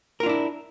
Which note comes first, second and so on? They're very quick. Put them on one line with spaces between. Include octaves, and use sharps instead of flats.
A#4 F4 D4 E4